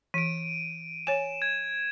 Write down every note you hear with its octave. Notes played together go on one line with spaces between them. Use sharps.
E3 D7 D#7
C#5 G#5 E7
G#6